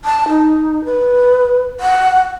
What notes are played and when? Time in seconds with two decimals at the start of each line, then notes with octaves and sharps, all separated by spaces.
0.05 A5
0.29 D#4
0.85 B4
1.80 F#5